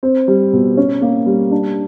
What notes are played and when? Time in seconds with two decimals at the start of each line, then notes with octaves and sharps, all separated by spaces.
0.03 C4
0.28 G3
0.53 B2
0.77 C#4
1.01 A#3
1.26 G3
1.52 D4